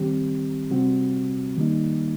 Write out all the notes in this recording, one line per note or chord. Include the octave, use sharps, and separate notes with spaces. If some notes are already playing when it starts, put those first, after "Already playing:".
Already playing: D#3 G3 C4 G4
C3 G3 C4 F#4
D#3 G3 A#3 D#4